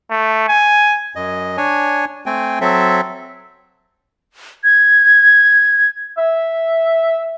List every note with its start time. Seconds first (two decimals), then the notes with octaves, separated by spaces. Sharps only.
0.10 A3
0.48 G#5
1.16 F#2 D#5
1.57 D4 C#5 G#5
2.26 A3 C4 G5 G#5
2.61 F#3 C4 A4 E5
4.64 G#6
6.18 E5